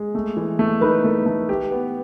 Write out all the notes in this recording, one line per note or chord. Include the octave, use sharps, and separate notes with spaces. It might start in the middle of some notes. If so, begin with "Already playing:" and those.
Already playing: G#3
A3
E3
A3
D#4 B4
A3
A3
G4
B3